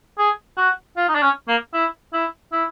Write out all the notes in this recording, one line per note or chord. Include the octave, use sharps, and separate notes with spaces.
G#4
F#4
F4
D#4
D4
C#4
A#3
E4
E4
E4